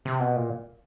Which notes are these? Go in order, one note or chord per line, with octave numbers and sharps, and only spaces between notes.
C3
B2
A#2